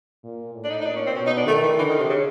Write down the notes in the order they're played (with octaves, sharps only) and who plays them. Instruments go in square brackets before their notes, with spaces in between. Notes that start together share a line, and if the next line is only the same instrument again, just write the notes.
[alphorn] A#2
A2
[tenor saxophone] D4
D#4
D#4
[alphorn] A#2 [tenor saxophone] D4
[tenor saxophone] C#4
C4
[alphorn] B2 [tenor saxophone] C#4
[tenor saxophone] D#4
D4
[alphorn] D#3 [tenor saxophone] A3
[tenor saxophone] E3
[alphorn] D3 [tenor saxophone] E3
[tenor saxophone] D#3
C3
C#3